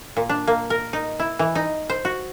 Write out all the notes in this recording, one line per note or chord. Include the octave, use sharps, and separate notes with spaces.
A#2
D4
A#3
A#4
D#4
E4
E3
D#4
C5
F#4